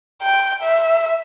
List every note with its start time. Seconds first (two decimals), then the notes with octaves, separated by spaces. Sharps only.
0.22 G5
0.62 E5